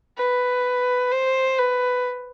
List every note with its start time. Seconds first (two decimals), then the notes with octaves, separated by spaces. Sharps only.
0.17 B4
1.12 C5
1.58 B4